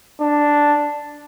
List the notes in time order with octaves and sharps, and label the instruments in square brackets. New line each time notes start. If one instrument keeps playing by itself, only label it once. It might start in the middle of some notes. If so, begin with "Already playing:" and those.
[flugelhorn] D4